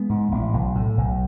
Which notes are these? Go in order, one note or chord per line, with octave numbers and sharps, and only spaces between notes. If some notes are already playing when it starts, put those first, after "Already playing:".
Already playing: G#3 B3
G#2
A1
B1
A2
B1